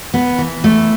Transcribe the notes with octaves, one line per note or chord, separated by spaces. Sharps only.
B3
E3
A3